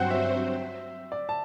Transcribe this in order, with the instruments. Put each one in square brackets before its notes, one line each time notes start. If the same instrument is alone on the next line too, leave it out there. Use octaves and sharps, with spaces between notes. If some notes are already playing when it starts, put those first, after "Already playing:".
Already playing: [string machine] G2 F#3 C4 F#4 C5 [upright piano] F#5 G5
[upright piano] E5
D5
A5